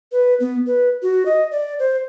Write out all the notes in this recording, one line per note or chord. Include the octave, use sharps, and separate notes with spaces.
B4
B3
B4
F#4
D#5
D5
C5